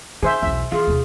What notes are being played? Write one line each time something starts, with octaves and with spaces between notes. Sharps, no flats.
D#3 G#4 C5 E5
B1 E2 E5
E3 F4 G#4
D#2 C3